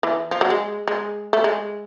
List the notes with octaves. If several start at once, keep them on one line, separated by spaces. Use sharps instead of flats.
E3
F3
F#3
G#3
G#3
A3
G#3